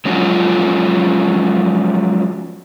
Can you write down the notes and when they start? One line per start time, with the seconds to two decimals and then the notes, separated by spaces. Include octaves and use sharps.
0.05 F3 F#3 G#3 C#4 F4 F#4